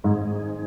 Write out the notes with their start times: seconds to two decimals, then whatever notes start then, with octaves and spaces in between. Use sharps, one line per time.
0.04 G#2 D#3 C4 D#4 G#4